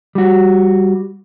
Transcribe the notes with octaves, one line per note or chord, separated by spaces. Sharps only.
G3 F#4